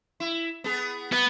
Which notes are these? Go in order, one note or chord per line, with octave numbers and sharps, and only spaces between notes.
E4
B3 G#4
B3